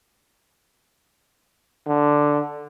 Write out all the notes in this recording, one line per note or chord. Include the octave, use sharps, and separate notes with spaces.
D3